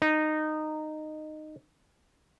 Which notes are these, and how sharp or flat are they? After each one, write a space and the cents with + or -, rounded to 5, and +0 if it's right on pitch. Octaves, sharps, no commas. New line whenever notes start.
D#4 -15